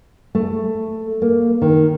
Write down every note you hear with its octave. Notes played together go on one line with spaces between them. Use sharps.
A3
A#3
D#3